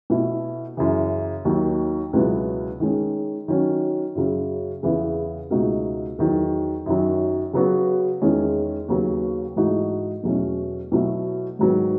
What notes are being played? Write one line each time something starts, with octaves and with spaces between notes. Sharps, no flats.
B2 A3 E4
F#2 C#3 E3
D#2 D#3 F#3
C#2 B2 F#3 B3 E4
D#3 G#3 C#4
D#3 F#3 C#4 F#4
F#2 C#3 F#3
E2 C#3 E3 B3 E4
C#2 B2 A3 D#4 F#4
E2 D#3 F#3
F#2 D#3 F#3
C#3 F#3 B3 F#4
E2 D#3 G#3 C#4
D#2 C#3 F#3 B3
G#2 E3 A3 D#4 F#4
E2 B2 F#3 A3 C#4
B2 F#3 A3 E4
G#2 D#3 F#3 B3 F#4